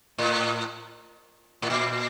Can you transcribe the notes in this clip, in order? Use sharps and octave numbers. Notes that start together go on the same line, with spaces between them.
A2
A2
A#2